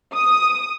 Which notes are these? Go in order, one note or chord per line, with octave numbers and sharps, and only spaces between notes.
D#6